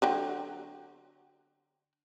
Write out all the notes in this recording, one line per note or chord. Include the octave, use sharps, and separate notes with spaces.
D3 F#3 G5